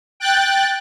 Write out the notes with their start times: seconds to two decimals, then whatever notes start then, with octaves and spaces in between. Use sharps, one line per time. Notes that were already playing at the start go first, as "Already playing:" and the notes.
0.20 G5 F#6 A6